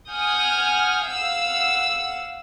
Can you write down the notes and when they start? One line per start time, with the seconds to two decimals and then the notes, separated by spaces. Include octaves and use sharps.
0.11 F#5 G#5 D#6 F6 G6
1.05 F5 F#5 E6